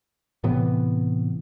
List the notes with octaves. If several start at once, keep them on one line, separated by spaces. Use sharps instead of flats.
A2 C3 E3 B3